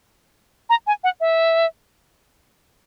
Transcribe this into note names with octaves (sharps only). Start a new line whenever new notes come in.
A#5
G#5
F#5
E5